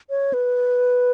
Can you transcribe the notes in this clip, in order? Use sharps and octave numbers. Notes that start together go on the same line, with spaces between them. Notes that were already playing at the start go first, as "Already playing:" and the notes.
C#5
B4